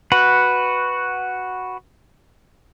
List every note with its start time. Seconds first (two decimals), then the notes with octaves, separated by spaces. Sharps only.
0.12 F#4 B4 F#5